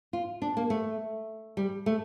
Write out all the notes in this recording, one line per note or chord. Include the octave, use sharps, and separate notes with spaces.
F4
D4
A#3
A3
G3
A3